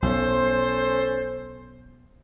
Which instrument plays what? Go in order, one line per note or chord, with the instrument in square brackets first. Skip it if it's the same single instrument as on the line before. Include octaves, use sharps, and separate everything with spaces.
[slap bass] B1 [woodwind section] C#4 A4 C5